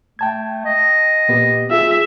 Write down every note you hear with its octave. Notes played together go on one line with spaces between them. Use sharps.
A3 G5 A5 G#6
D#5
A#2 B3 G4
F4 G#4 E5